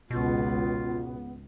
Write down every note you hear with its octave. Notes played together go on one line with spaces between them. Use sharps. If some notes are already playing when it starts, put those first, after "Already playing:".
G#1 C#2 B2 B3 F4